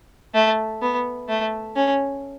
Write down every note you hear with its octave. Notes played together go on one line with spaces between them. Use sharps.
A3
B3
A3
C#4